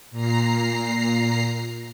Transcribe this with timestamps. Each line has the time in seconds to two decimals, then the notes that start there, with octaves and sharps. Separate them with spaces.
0.11 A#2 A#5 C7